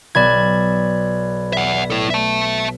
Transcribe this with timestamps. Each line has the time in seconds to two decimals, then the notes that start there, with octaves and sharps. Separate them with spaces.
0.15 B1 D5 B5 G#6
1.53 E5 F#5
1.90 E4 A4
2.10 E5 A5